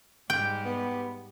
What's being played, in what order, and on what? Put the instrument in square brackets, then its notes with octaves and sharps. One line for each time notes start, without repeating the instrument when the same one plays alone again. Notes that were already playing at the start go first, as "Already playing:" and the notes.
[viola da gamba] G#2 G3 G4 [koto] G5
[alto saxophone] B3